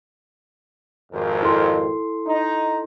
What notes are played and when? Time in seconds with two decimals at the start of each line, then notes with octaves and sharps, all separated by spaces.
1.12 G#1 F2
1.43 E4 A4 C6
2.26 D#4